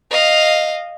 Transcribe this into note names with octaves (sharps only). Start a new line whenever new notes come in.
D#5 F5